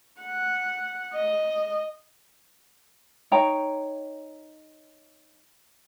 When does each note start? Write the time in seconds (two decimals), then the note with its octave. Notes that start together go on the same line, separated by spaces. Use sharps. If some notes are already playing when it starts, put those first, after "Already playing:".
0.22 F#5
1.14 D#5
3.31 D#4 C#5 G5 A#5